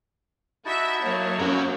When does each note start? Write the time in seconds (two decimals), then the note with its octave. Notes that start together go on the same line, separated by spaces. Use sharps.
0.65 D#4 E4 F#4 E5 A5
1.03 F#3 A#3 C#5
1.39 C#4 A#4